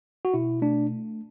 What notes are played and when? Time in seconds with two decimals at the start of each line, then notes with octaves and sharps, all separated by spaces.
0.25 F#4
0.34 B2 E4
0.62 A3 D4